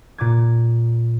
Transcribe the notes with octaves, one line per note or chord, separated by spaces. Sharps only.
A#2 D6 G#6